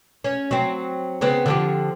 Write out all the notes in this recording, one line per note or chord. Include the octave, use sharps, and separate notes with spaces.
C#4
F#3 C4
C#3 B3 C4
D3 F3 G4